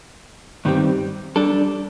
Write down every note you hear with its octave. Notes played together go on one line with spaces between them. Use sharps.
G2 D#3 G3 C4 G4
G3 D4 A4